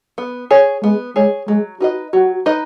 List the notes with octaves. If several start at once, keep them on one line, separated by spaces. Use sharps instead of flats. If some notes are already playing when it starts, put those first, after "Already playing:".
B3
G#4 C#5
G#3 B3
G#3 G#4 C#5
F#3 G#3
D#4 F#4 B4 D#5
F#3 F#4
D#4 B4 D#5